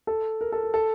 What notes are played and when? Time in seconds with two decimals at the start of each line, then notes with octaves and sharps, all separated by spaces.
0.07 A4
0.41 A#4
0.52 A4
0.63 A#4
0.74 A4